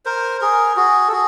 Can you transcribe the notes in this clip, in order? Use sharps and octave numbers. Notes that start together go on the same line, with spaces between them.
A#4 C5
G#4 A#4
F#4 G#4
A4
F#4 G#4